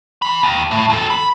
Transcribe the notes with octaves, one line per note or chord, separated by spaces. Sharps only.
E3 B5
D#2
A2 A3
D#2 A4
B5